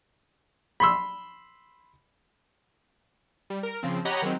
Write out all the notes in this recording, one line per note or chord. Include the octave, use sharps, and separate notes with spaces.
B5 C6 E6
G3
A#4
C#3 F3 C4
G4 C#5 D#5 F#5 A#5 B5
D#3 F#3 G#3 C4